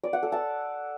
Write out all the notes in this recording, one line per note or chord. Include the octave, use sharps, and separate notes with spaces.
D5
F#5
A4
A5